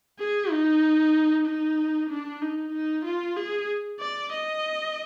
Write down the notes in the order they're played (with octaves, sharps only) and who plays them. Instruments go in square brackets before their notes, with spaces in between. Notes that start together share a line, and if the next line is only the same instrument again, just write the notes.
[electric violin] G#4
D#4
D#4
D4
D#4
D#4
F4
G#4
D5
D#5